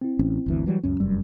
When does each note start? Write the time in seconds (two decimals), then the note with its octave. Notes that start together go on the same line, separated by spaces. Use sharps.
0.01 C4 E4
0.19 A1 C#4
0.46 G1 D2 E3
0.66 E3 F#3 G3
0.83 C#2 F#2 C#4
1.00 F1 F#2 G3